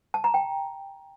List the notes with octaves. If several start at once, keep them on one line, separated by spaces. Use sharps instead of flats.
A5
A#5
G5